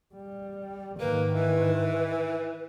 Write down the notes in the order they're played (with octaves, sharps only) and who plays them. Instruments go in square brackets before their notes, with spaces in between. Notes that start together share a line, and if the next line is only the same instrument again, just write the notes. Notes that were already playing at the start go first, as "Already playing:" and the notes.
[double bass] G3
[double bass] G#2 D#3 [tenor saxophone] A#3 [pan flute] B4
[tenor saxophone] E3